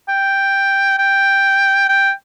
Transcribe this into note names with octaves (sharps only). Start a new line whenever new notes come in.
G5
G5
G5